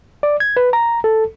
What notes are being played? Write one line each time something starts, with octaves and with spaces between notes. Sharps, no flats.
D5
G#6
B4
A#5
A4